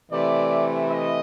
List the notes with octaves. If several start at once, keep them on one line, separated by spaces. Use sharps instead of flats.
C3 E3 A3 D5
D#5